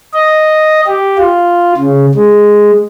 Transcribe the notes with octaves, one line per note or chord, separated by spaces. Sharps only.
D#5
G4
F4
C#3
G#3